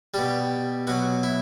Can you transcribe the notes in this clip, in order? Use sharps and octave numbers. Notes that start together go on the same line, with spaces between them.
B2 G3 G4
B2 F#3 F#4
E4